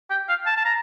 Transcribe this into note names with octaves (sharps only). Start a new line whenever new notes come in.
G5
F5
A5
A5
A#5